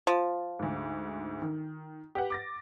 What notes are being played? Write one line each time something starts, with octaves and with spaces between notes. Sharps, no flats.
F3
D2 G#2
D#3
G4 B4 F#5
D6 A6 A#6